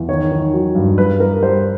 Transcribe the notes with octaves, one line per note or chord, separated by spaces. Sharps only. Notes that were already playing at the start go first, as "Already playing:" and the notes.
Already playing: E2
D#3 C#5
D#3
F#3
G2
G3 B4
G3 A#4
G3 C5